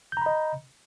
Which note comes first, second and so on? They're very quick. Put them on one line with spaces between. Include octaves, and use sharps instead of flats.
G6 A#5 B5 D#5